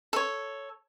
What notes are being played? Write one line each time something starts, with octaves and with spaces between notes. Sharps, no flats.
A4 C#5